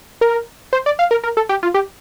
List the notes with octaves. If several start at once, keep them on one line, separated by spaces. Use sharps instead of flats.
A#4
C5
D5
F5
A#4
A#4
A4
G4
F4
G4